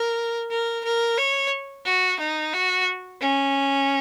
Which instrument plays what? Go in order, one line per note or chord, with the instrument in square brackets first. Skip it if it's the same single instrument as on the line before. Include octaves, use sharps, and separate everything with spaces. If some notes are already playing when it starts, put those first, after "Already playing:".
Already playing: [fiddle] A#4
A#4
A#4
C#5
F#4
D#4
F#4
C#4